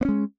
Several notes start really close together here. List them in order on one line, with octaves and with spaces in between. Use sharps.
B3 C#4 G#3